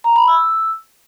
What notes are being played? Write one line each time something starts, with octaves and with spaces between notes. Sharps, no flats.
A#5
B5
E6